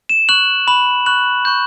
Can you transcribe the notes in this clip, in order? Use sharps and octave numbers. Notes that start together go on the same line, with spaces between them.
E7
C#6 F#6 F#7
B5 F#6 F#7
C#6 F#6 F#7
C#6 G6